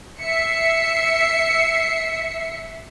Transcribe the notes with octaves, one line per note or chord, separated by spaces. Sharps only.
E5 C7 C#7